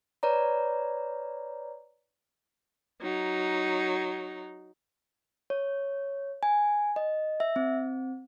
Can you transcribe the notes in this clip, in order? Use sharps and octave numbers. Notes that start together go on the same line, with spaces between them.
B4 C#5 D5 A#5
F#3 D#4
C#5
G#5
D#5
E5
C4